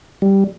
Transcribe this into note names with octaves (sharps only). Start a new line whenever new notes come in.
G3